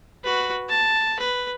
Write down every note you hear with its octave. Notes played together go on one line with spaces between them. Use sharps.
F#4 B4
A5
B4